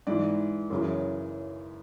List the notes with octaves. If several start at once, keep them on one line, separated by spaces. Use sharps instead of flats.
G#2 E3 D5
F#2 C#3 E3